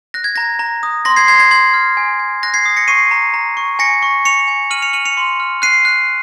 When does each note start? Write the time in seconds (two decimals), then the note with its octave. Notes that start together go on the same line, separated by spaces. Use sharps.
0.14 F#6 A#6
0.24 G#6
0.36 A#5 A#6
0.59 A#5
0.83 D#6
1.05 C6 A#6
1.16 G#6 C7
1.28 C6 G#6 C7
1.39 G#6
1.51 C6 G#6
1.74 F6
1.97 G#5
2.20 G#5
2.43 F#6 A#6
2.54 G#6 C7
2.66 D#6
2.77 A#6 C#7
2.88 C#6 C7 D#7
3.11 A#5
3.34 A#5
3.57 C#6
3.79 G#5 A#6 C#7
4.03 C#6
4.25 C#6 C#7 F7
4.48 G#5
4.71 F6 D#7 F#7
4.82 C#7 F7
4.93 F6 D#7 F#7
5.05 C#7 F7
5.17 C6
5.40 F6
5.62 F#6 C7 D#7
5.85 F#6